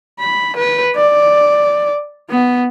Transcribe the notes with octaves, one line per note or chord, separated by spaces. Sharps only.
B5
B4
D5
B3